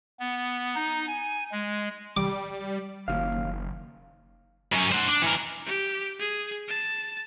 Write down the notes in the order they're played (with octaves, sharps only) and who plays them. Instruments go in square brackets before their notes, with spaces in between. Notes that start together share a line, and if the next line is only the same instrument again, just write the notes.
[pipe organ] B3
D#4
G#5
G#3
[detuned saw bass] G3 [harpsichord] D6
[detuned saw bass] F#1 [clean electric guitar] D#2 C#3 F5
[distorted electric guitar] F#2 C#4
C5 F#5
D4
E3 A#4
[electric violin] G4
G#4
A5